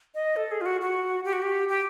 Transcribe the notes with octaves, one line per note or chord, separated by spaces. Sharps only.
D#5
A4
G#4
F4
F#4
F#4
G4
F#4
G4
G4